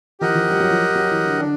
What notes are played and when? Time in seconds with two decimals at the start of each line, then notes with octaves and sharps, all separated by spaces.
0.20 F3 G4 A#4 D#5 F#5
0.28 E3
0.35 F3
0.51 G3
0.60 F#3
0.71 F3
0.95 F#3
1.11 E3
1.25 D3
1.40 D3 D4